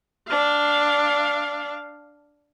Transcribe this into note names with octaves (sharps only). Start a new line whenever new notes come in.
D4 F5